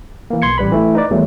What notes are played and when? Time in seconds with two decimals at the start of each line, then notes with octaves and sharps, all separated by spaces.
0.30 E3 A#3
0.42 B1 C6 G#6 C#7
0.58 A1 G3 B4 B5
0.71 E3 A3 E4
0.95 D#4 B4 D5
1.11 E2 D#3 F#3 G3 A3